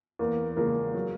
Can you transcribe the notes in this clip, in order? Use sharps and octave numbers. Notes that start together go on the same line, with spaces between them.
E2 A#3
C#3 F3 G#3 A#3
F#3